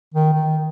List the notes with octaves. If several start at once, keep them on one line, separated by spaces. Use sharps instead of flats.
D#3
D#3